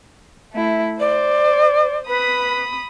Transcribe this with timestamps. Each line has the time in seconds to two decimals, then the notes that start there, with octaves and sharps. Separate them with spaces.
0.53 A3 E4
1.00 C5 D5
2.08 B4 B5 D#6